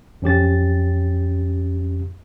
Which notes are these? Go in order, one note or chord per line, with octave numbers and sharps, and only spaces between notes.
F2 C#4 G4 A6